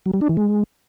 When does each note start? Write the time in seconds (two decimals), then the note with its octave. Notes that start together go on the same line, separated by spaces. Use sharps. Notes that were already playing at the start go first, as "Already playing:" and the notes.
0.06 F#3
0.14 G3
0.21 D4
0.29 E3
0.37 G#3